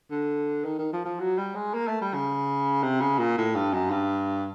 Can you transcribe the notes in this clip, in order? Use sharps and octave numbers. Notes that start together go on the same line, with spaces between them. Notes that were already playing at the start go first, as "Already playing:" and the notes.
D3
D#3
D#3
F3
F3
F#3
G3
G#3
A#3
A3
G3
C#3
C3
C#3
A#2
A2
G2
F#2
G2